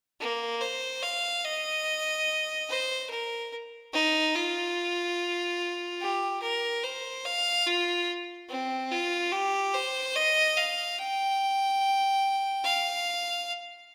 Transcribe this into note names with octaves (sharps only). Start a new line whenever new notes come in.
A#3
C5
F5
D#5
C5
A#4
D#4
F4
G4
A#4
C5
F5
F4
C4
F4
G4
C5
D#5
F5
G5
F5